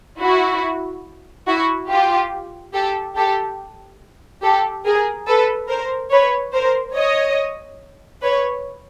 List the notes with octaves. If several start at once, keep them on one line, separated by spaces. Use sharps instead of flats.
E4 F#4
E4 F#4
F4 G4
G4 A4
G4 A4
G4 A4
G#4 A#4
A4 B4
A#4 C5
B4 C#5
A#4 C5
C#5 D#5
B4 C#5